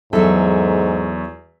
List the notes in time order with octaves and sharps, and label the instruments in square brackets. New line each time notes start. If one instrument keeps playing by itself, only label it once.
[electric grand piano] E2 E5 [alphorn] G#2 [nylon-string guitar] F#3 A4